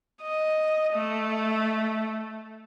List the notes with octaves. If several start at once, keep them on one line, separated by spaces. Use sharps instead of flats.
D#5
A3